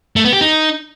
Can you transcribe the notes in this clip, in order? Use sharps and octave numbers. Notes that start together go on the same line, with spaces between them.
A3
B3
G4
D#4